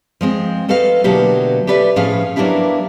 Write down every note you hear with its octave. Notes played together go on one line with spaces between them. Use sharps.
F3 G#3 C4
A3 A4 B4 D#5 F5
B2 D3 F#3 A#3 E4 G4
G4 A4 B4 D5 E5
A2 F3 C#4 G#4 F5
F#3 A#3 B3 D4 E4 G4